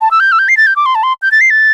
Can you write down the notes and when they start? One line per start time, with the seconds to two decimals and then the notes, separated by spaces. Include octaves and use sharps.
0.01 A5
0.11 E6
0.20 G6
0.32 E6
0.39 G6
0.49 C7
0.57 A6
0.67 G6
0.76 D6
0.86 C6
0.95 A5
1.03 C6
1.22 G6
1.32 A6
1.41 C7
1.50 A6